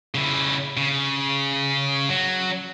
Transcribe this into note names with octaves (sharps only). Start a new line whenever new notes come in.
C#3 E4
C#3
F#3